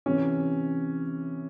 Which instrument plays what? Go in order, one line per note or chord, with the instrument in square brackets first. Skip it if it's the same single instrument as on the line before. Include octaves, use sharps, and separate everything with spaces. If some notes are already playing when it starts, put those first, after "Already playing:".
[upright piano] C3 E3 C#4